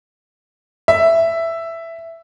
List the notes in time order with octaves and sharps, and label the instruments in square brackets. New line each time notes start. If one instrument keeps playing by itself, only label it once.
[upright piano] E5